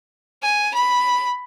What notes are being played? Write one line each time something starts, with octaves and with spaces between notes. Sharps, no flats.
G#5
B5